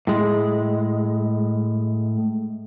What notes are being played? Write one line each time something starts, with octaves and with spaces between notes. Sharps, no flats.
A2 G#3